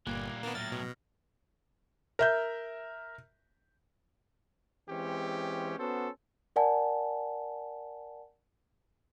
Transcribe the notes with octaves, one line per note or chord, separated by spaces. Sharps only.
G1 A#2 G3 A#3 F#6 G#6
D#3 A#3 B3 D4
A2 F#3 F6 A6 A#6
B2
A#4 E5 G6
E3 G#3 C4 C#4 G4
B3 C#4 F#4 A4 C5
A#4 D5 F#5 G#5 A5